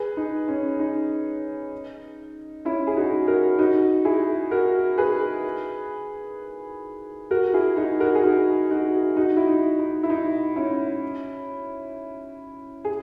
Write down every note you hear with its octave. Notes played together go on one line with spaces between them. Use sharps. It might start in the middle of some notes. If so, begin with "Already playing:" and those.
Already playing: G#4 B4
D#4
C#4
D#4
C#4 E4
G#4
D#4 F#4
F#4 A#4
D#4 F#4
E4 G#4
F#4 A#4
G#4 B4
F#4 A#4
E4 G#4
D#4 F#4
F#4 A#4
G#4
D#4 F#4
D#4 F#4
D#4 F#4
E4
D#4
D#4
E4
D#4
C#4 E4
G#4